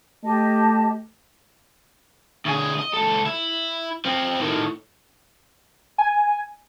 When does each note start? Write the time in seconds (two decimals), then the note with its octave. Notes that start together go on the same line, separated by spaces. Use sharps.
0.23 A3 G4 D#5 A5
2.45 D2 G#4
2.79 D#5
2.93 C#2 A4
3.26 E4
4.05 F3 C4
4.40 A2 D#3
5.98 G#5